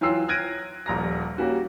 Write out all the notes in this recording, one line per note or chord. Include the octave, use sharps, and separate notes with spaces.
E3 F#3 F4 G5 E6 C7
F6 F#6 G#6 A#6 D7 D#7
D#1 A#1 A#5 A#6
G3 A#3 C#4 F#4